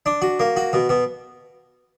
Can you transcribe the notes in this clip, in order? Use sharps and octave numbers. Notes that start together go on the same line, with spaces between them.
D4
F#4
A#3
F#4
B2
B2